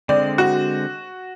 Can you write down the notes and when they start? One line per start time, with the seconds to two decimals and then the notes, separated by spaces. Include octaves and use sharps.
0.09 D3 G#3 C4 D5
0.38 F#4